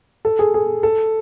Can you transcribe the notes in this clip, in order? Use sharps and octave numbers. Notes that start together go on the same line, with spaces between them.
A4
G#4
G#4
A4